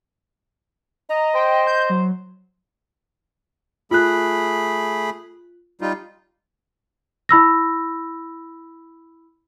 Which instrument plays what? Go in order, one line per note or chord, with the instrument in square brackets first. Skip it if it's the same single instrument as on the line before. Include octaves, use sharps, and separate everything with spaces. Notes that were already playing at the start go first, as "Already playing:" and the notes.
[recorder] D#5 [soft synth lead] A#5
[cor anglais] C5 [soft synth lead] G5
[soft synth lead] G6
F#3
[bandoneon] A3 G#4 B5 [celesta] F4 F#6
[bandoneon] G3 D#4 F4
[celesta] E4 B5 E6 A#6